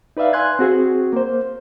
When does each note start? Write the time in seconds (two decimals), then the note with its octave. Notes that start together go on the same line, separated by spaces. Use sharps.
0.17 D#4 B4 D5 E5 F5
0.33 G#5 C6 F#6 G#6
0.59 C4 F#4 G#4
1.13 A#3 C5